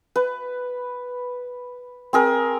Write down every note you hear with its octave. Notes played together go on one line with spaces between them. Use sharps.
B4
C4 G#4 A#4